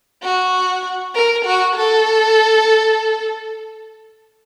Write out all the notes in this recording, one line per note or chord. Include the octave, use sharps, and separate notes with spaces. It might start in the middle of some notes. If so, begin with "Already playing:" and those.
F#4
A#4
F#4
A4